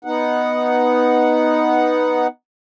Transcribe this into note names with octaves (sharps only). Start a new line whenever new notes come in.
B3 D#4 F#5